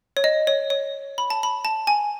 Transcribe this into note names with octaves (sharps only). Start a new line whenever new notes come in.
C#5
D#5
C#5
C#5
B5
A5
B5
A5
G#5